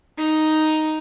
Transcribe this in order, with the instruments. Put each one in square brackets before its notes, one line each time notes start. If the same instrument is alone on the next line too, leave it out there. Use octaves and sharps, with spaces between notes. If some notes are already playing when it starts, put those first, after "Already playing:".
[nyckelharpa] D#4